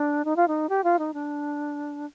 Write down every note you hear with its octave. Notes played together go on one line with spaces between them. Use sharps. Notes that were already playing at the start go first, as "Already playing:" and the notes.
Already playing: D4
D#4
F4
D#4
G4
F4
D#4
D4